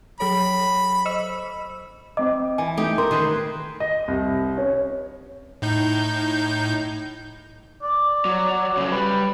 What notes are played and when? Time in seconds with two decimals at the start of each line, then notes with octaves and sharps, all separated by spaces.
0.20 F#3 A4 C#5 B5
1.05 C5 D#5 E6
2.17 C4 D#5 D6
2.58 E3 G#5
2.77 A3 D#4 G4
2.98 A#4 C6
3.11 D#3 G#4 B4 C5
3.80 D#5
4.08 C2
4.58 C#4
5.62 A2 D#4 G6
7.83 D5
8.25 F#3
8.77 C#3 A3
8.91 G3 B4